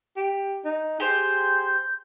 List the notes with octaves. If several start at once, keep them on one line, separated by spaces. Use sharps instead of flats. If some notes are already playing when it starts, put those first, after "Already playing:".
G4
D#4
G4 G#4 C5 G6